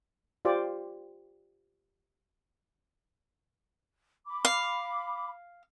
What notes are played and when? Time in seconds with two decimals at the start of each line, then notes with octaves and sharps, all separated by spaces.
0.45 F4 G4 C5 D5
4.27 B5 D6
4.45 F5